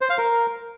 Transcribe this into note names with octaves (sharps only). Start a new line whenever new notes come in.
C5
F5
A#4